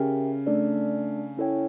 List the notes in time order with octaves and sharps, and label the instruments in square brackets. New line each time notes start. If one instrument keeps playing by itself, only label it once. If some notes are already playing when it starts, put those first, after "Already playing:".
Already playing: [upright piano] C#3 [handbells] G4 A#4 E5 G5
[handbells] A3 D4 A4 D5
C#4 E4 A4 C#5 G5